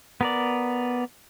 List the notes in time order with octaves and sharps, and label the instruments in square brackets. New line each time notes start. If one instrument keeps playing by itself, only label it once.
[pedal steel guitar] B3 A#4 D5